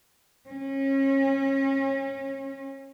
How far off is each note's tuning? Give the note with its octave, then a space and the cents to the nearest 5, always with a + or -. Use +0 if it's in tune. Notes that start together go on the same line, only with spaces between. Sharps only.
C#4 -30